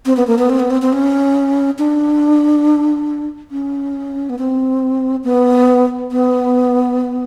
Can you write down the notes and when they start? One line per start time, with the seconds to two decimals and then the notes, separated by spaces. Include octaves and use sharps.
0.06 C4
0.17 B3
0.27 A#3
0.39 B3
0.50 C4
0.60 B3
0.70 C4
0.82 C4
0.93 C#4
1.79 D4
3.51 C#4
4.30 B3
4.38 C4
5.24 B3
6.11 B3